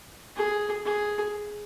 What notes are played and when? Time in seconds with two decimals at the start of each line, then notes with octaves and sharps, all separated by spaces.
0.36 G#4
0.85 G#4